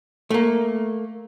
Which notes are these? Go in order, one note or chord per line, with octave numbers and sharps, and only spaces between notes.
A3 A#3